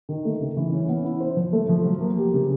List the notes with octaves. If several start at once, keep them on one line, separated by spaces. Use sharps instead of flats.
D#3
A3
C#3
E3
C#4
B3
E4
C5
F3
A3
F3
F#3
A#3
G4
C#3